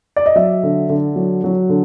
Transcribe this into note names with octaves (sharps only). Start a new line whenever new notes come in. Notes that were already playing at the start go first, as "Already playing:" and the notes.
D5
D#5
F#3 E5
D3
D3
F#3
F#3
D3